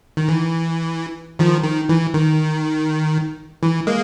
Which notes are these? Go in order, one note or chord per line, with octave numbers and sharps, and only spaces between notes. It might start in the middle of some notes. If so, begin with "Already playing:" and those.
D#3
E3
D#3 F3
D#3
E3
D#3
E3
G#3 A#3